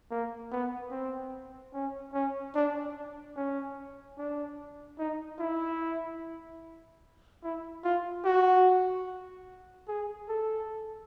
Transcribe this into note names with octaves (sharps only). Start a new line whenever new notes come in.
A#3
B3
C4
C#4
C#4
D4
C#4
D4
D#4
E4
E4
F4
F#4
G#4
A4